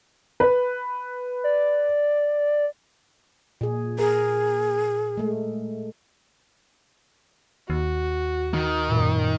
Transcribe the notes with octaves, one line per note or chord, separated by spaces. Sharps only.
B4
D5
A#2 G#4
G#4 A#4
G#3 A3
D#2 F#4
D#3
F#2 A#2